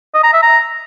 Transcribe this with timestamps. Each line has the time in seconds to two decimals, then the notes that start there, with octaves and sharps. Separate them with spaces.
0.14 D#5
0.24 A#5
0.33 E5
0.42 A#5